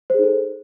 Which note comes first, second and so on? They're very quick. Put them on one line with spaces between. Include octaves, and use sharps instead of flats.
C5 G#4 D#4 A4